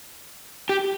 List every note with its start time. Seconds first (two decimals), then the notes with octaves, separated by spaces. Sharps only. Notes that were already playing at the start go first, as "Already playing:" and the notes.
0.69 G4